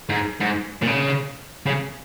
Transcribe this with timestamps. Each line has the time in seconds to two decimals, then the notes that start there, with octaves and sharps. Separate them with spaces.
0.09 G#2
0.40 G#2
0.82 A#2
0.87 C#3
1.67 C#3